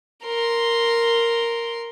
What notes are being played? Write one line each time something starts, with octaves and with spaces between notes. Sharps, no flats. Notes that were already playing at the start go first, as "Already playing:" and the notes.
A#4 C6